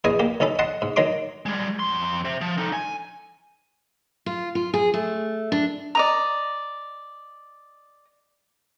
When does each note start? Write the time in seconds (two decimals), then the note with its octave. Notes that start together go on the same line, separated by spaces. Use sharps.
0.04 A#1 E2 G#4 D#5 G#5 D#6
0.20 A#3 G4
0.40 B1 C#4 D#4 A4 B5
0.59 D#5 F#5 A5 C6
0.82 G#2
0.96 D#3 F#3 D#4 A#5 C6 D6
1.46 G3 G#3
1.79 F2 C6
2.25 C5 E5
2.41 F3
2.58 D#4 A4
2.73 G#5
4.26 F4
4.55 F4
4.74 G#4
4.94 A3
5.52 D4
5.95 D5 D#5 A#5